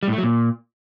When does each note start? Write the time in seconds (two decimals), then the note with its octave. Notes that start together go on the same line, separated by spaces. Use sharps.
0.03 G3
0.08 A2
0.13 A3
0.18 F#3
0.23 A#2